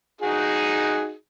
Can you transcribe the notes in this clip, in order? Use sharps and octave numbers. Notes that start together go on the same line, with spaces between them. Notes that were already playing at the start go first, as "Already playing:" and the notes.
D#4 F#4 G#4